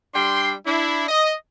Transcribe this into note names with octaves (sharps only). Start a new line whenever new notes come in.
G3 D4 G5 C6
D4 E4
D#5